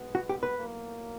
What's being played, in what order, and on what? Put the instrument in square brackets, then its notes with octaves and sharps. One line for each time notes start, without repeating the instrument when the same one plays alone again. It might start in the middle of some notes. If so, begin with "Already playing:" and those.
Already playing: [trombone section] B1 B2 G#3 B3
[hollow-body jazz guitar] F#4
G4
B4
[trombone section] B1 A2 F#3 A#3